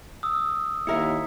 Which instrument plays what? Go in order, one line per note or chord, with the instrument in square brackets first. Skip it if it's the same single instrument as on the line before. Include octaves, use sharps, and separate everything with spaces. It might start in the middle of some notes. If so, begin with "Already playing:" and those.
[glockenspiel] D#6 E6
[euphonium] D#2 [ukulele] E4 A#4 E5 [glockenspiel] B6 C#7